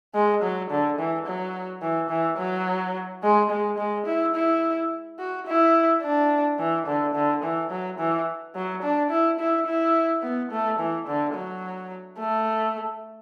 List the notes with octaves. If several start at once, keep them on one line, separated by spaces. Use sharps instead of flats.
G#3
F#3
D3
E3
F#3
E3
E3
F#3
G#3
G#3
G#3
E4
E4
F#4
E4
D4
E3
D3
D3
E3
F#3
E3
F#3
D4
E4
E4
E4
B3
A3
E3
D3
F#3
A3